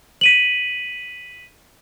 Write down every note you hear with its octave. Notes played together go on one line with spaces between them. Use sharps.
B6 D#7 F#7